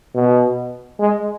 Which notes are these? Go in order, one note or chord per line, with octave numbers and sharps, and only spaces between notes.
B2
G#3